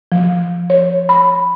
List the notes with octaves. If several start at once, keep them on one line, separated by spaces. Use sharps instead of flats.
F3
C#5
B5